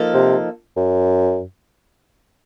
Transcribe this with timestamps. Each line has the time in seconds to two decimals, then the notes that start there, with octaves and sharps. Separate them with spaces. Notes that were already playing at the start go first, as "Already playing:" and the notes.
Already playing: F3 A#3 D#4 A4
0.14 C3
0.76 F#2